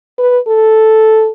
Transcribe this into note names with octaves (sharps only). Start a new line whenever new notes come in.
B4
A4